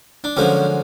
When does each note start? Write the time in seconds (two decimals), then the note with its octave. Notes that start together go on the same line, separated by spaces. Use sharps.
0.24 D4
0.37 F#2 D3 F3 G#3 C#4